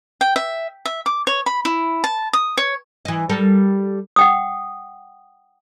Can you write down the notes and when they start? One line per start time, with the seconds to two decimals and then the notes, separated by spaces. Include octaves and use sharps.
0.21 G5
0.36 E5
0.85 E5
1.06 D6
1.27 C#5
1.46 B5
1.65 E4
2.04 A5
2.33 D#6
2.57 C#5
3.05 E3 D#5
3.29 G3 A4 A#4
4.16 F#5 G5 D#6